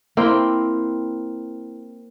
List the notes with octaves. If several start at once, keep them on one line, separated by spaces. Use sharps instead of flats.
A#3 C4 E4 G5